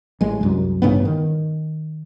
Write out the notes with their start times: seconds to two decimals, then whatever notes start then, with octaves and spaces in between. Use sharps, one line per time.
0.21 A1 G#3
0.41 C2 F#2
0.82 A1 G2 C#3 B3
1.05 D#3